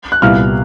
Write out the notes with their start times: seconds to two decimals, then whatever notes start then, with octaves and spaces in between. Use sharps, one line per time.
0.12 F#6
0.22 C2 A#2 G3 B3 E4 F5 F6